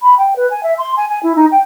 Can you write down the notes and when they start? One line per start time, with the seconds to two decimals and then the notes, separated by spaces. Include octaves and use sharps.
0.01 B5
0.18 G5
0.36 B4
0.50 G#5
0.63 E5
0.78 C6
0.96 G#5
1.08 G#5
1.23 E4
1.36 D#4
1.51 G5